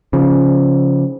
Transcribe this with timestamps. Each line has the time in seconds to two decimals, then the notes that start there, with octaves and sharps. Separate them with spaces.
0.13 C#3 F3